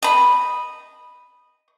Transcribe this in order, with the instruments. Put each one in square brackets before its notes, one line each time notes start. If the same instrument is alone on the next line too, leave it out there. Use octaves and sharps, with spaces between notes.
[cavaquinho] D#5 B5